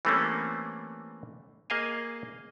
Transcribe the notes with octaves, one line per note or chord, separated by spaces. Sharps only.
E3 G3 A3 A#3 C4 C#4
A#3 G#4 D#5 F5 G#5